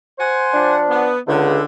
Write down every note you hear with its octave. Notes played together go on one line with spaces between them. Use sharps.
C5 F#5 G#5
F3 D4
B3
C#2 D3